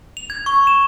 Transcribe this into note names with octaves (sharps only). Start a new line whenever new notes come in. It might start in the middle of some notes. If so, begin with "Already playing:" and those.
F7
G#6
C#6
E7